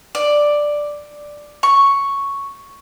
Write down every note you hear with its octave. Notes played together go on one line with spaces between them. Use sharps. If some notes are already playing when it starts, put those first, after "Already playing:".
D5
C#6